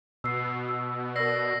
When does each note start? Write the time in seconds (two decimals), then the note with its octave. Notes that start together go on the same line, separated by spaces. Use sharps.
0.24 B2 E6 C7
0.68 E6
1.16 A#4 D5 E6 A#6 C7